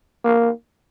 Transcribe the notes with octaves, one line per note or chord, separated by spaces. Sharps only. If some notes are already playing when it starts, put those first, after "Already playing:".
A#3